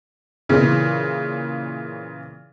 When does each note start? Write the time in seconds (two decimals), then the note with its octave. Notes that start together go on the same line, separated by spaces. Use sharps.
0.49 A#2 C#3 E3